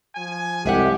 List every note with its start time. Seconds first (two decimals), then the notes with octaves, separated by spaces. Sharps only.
0.16 F3 G#5
0.66 C2 G#3 G4 E5 F#5